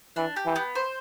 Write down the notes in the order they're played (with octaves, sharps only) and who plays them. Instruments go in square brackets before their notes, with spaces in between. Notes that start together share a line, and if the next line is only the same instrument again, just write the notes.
[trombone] E3 [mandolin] D4
[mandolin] G4
[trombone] E3
[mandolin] B3
C5